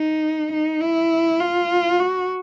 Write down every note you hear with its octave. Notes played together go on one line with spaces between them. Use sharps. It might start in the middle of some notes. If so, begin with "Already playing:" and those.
Already playing: D#4
D#4
E4
F4
F#4